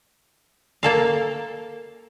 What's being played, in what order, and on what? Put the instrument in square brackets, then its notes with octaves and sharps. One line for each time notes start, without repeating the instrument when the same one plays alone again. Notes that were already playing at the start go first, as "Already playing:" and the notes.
[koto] A#3 A4 F5